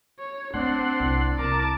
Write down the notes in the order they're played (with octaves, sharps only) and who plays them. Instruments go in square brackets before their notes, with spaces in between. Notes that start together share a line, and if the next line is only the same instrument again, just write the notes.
[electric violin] C#5
[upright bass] A3 [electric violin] C4 [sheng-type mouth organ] D4 [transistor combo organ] F#5 C6
[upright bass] C2 A#3
[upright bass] C2 [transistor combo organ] A#4 [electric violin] A5 D6